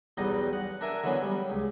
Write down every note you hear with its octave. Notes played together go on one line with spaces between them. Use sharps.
B1 E2 G3 B3 D#4 D#5
F#5
D4 A#4 E5 G#5
D3 E3 F#3 B3 C#4
G3
C#2